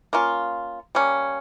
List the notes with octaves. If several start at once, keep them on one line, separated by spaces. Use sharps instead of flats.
A#3 C#4 F4
G3 A#3 C#4